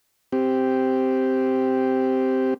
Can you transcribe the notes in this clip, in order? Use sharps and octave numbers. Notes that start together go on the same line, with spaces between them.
C4 G4